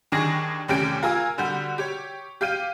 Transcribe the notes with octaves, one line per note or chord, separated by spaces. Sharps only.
D#2 D#3 D4 G#4 C#6 A#6
F1 D#2 C#4 G4 D7
F4 A#4 G#5 E6
D3 G3 F#4 G6
G4 C#5
G4 F5 G6 D#7